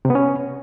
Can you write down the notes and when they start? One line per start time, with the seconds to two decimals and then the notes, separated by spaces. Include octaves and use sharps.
0.05 C3
0.10 B3
0.15 C#4